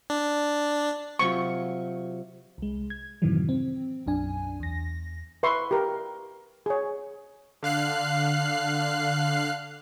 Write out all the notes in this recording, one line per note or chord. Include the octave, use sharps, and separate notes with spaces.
D4
C3 F#3 F4 C#6
C2 G#3
G#6
F#2 A2 C3 D#3 E3 F#3
C4
B1 F#2 D4 G#5
E2 A#6
B4 E5 C6 C#6
G4 A#4
G#4 C#5
D3 F5 F#6 C7